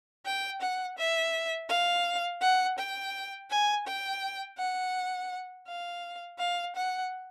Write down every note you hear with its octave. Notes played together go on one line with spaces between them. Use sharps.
G5
F#5
E5
F5
F#5
G5
G#5
G5
F#5
F5
F5
F#5